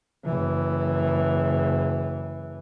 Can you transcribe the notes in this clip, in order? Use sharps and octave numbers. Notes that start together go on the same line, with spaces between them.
F#1 E3